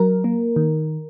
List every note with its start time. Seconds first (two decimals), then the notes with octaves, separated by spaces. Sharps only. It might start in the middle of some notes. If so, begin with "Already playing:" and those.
Already playing: F#3 A#4
0.24 A#3
0.56 D#3